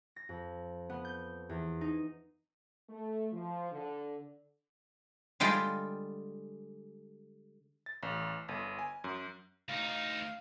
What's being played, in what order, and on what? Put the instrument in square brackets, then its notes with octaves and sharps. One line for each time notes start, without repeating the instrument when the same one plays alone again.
[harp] A#6
F2
B3
G6
E2
D#4
[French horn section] A3
F3
D3
[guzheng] D3 G3 G#3 F4 G5
[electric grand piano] A6
A1
G1
G#5
F#2
[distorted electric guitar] D2 D#4 [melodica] F5